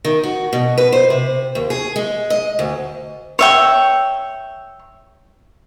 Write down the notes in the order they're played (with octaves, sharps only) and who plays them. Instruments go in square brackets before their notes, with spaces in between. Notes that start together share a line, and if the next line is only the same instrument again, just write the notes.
[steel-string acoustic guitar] D#3
F#4
B2
B4
C5
C3
D#2
G#4
G#3
D#5
D2
[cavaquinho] C#5 E5 G5